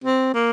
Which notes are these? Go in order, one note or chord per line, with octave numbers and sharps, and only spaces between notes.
C4
A#3